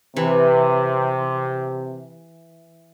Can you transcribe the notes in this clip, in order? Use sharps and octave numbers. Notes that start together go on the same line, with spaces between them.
C3 E3